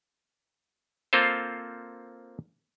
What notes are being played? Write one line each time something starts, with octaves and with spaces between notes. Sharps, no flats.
A#3 C4 F4 A4 C5